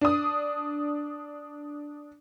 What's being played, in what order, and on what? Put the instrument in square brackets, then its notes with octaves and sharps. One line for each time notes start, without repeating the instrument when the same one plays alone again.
[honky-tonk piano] D4 D#6